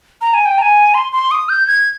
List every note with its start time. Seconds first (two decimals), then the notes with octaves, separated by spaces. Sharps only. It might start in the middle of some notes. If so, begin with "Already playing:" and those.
0.21 A#5
0.34 G#5
0.46 G5
0.58 A#5
0.62 G#5
0.94 C6
1.13 C6
1.31 D#6
1.49 G6
1.67 G#6